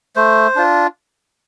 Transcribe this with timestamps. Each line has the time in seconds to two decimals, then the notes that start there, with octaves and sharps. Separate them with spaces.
0.16 A3 C5
0.56 D4 F4